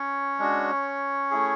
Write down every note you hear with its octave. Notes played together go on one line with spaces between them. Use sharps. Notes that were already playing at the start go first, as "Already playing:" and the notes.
Already playing: C#4 C#5
G#3 D4 F#4
A3 E4 G#4